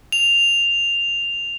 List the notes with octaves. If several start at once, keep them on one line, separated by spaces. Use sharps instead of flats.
F7